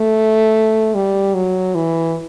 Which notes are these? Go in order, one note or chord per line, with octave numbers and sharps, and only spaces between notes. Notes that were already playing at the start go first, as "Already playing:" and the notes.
Already playing: A3
G3
F#3
E3